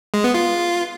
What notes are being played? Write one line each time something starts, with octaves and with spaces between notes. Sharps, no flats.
G#3
B3
F4